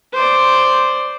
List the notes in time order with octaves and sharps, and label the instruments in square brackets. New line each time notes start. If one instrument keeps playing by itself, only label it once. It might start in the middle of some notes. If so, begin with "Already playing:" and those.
[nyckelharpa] C5 D5